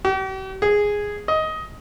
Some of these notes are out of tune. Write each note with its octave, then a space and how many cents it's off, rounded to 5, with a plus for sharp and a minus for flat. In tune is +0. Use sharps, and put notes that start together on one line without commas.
G4 -45
G#4 -5
D#5 +15